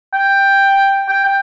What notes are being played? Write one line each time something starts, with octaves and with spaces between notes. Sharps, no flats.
G5
G5
G5